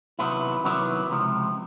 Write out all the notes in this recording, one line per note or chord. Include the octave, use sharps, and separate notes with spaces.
C3 D#3 F#3 B3 E4
C3 D#3 F#3 B3 E4
C#2 C3 F3